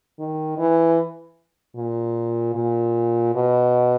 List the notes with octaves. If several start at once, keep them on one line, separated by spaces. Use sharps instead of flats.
D#3
E3
A#2
A#2
B2